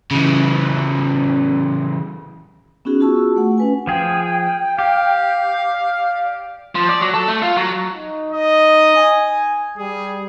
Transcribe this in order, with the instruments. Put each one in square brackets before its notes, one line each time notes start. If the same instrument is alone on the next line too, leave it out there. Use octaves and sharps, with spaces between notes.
[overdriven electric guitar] C#3 E3
[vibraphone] B3 C#4 D#4 F#4 G#4
F4 F#4 G#4 A5 C#6 E6
A3 F#5
C#4 B4 G#5
[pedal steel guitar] F3 G#4 [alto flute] G5
[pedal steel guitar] G4 [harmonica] F5
[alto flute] D5
[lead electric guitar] F3
D5
F#3
A4
A3
F4
F#3
[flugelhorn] D#4
[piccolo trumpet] D#5
[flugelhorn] G#5
[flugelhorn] G3 [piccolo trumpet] G#4